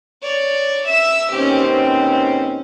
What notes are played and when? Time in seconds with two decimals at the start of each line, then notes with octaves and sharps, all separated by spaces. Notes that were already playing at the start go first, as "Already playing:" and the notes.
0.23 C#5 D5
0.87 E5 E6
1.32 D#2 B2 C4 C#4 G4
1.66 C#4